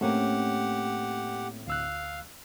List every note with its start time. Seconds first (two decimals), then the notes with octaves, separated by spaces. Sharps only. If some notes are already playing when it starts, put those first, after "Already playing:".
0.01 A2 A3 A#3 C4 C#4 G4 F#5
1.68 D2 F5 E6 F#6